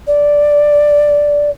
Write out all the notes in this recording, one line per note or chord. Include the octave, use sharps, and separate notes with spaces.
D5